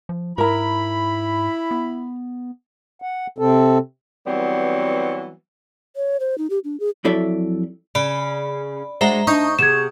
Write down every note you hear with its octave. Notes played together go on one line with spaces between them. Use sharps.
F3
G#2 E4 A#4 A#5 B5
B3
F#5
C3 C4 A4
E3 F#3 G3 B3 C4
C#5
C5
D#4
G4
D4
G#4
F2 F#3 E4 A4 D5 E5
C#3 D5 B5
G#3 D4 F#4 C5 E5 A#5
D4 D#4 C#6 D#6 G6
C3 B3 G#4 G#6 E7